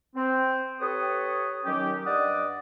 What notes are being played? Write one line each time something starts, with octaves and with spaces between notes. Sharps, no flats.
C4
G4 A4 B4 C#5 D#6
D#3 F#3 C#4 G4
G2 D5 D#5 F#5 D6 D#6